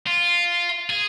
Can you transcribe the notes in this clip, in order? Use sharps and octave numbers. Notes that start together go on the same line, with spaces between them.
F4
G#4